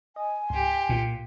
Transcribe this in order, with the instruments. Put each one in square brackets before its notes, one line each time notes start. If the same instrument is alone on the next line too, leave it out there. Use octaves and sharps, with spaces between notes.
[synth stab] D#5 [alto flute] G#5
[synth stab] C#2 G#2 [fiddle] G4 C6
[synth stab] C2 F4 [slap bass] A#2